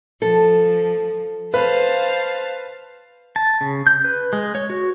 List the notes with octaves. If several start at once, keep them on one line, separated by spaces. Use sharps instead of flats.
F3 A4
B4 C5 F5 A5
A5
C#3
G6
B4
G#3
C#5
F#4